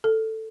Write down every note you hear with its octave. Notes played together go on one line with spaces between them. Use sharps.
A4